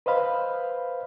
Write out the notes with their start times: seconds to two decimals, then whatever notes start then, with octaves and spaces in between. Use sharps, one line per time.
0.06 B4 C5 D#5 F5 B5